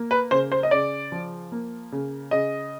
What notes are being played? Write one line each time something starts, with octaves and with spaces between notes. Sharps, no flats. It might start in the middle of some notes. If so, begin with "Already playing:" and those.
Already playing: A#3
B4
C#3 C5
C5
D#5
C#3 D5
F3
A#3
C#3
C#3 D#5